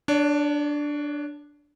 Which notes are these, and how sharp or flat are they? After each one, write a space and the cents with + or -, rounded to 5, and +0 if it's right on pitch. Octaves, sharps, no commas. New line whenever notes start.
D4 +0 C#5 +40